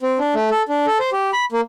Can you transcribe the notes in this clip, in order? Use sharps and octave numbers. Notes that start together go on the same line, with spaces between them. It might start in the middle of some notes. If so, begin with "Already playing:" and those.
C4
D4
A3
A4
D4
A4
C5
G4
B5
A#3